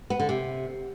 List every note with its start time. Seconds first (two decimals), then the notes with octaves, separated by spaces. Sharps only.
0.10 B3
0.20 D3
0.29 C3